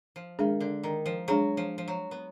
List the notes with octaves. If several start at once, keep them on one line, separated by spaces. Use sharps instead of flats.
F3
D#3 G#3 D4 G#4
D3
D#3
F3
F#3 G#3 D4 G#4
F3
F3
F#3
B3